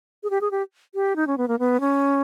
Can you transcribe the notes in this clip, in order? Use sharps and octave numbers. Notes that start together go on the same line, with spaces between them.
G#4
G4
G#4
G4
G4
D#4
C#4
B3
A#3
B3
C#4